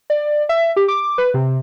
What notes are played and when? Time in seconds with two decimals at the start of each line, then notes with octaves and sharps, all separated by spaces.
0.10 D5
0.49 E5
0.76 G4
0.88 D6
1.18 B4
1.34 C3